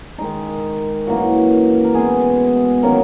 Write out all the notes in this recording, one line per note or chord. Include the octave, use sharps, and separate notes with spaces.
D#3 G#3 D#4
F#2 E3 A#3 F#4
A#4
B2 G#3 B3 G#4
D#3 F#3 A#3 C#4 A#4